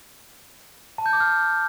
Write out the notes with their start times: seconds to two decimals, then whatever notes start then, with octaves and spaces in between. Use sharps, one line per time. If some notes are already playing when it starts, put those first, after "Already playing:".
0.98 A5
1.06 G6
1.13 D6
1.20 F6